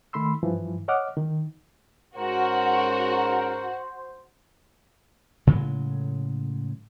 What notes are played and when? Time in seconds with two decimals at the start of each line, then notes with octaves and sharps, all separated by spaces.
0.13 D#3 A3 B5 C6 E6
0.43 G2 E3 F3
0.88 C#5 D#5 F#5 D6 F6
1.17 D#3
2.16 G#2 C#4 F#4 A#4 C5 F#5
5.47 A2 C#3 F#3 G#3